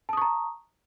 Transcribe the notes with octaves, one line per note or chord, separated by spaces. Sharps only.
A5 A#5 C#6 D#6